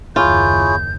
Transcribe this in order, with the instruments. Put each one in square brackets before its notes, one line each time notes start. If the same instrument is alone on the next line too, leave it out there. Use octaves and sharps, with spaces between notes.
[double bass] F#1 D#2 [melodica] E4 G#4 C#5 [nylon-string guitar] F4 [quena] G6